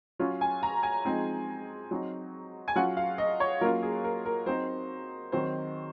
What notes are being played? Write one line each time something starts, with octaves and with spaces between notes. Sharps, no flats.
F#3 C#4 F4
G#5
A#5
G#5
F3 G#3 C4 D#4
F#3 C4 D#4
G#5
F#3 C#4 F4 F#5
F5
D#5
C#5
F#3 A#3 C#4 F4 A#4
G#4
A#4
A#4
F#3 C4 D#4 C5
D#3 F#3 C4 C5